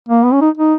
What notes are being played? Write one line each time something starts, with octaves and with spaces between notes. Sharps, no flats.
A#3
B3
C#4
D#4
D#4